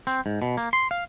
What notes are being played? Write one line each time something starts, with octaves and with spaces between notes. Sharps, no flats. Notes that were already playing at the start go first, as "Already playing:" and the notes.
C4
G#2
B2
A#3
C6
F5